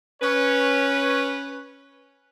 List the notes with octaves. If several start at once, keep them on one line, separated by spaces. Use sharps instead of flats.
C#4 B4 C#5